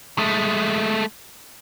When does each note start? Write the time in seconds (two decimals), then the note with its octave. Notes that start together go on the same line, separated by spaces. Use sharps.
0.18 G#3 A3